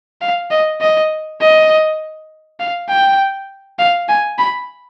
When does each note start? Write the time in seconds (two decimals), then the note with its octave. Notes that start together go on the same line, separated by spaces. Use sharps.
0.21 F5
0.51 D#5
0.81 D#5
1.41 D#5
2.60 F5
2.89 G5
3.79 F5
4.09 G#5
4.38 B5